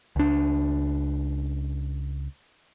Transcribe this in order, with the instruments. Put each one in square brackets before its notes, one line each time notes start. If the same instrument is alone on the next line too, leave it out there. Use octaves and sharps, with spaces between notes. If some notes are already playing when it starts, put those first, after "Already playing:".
[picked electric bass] C#2 D4